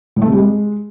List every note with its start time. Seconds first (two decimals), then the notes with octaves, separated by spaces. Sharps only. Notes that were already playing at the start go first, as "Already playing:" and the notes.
0.16 A2
0.22 A3
0.27 C3
0.32 G3
0.38 G#3